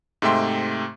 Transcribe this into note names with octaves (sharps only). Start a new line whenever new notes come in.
G#2 C3 A3 E5 G5 C6